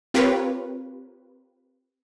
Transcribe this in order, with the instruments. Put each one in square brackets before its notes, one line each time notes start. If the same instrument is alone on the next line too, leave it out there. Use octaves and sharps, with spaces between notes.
[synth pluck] C4 F4 G4 A#4 B4 C#5